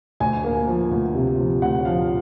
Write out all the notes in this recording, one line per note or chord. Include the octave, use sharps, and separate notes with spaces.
D2 G#5
A#3
F3
D2
C3
F3
D2 F#5
F3 F5